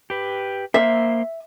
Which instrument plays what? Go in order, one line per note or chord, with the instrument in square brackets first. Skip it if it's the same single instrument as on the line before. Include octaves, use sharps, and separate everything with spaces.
[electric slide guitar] G4 B4
[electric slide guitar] A#3 C5 [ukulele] E5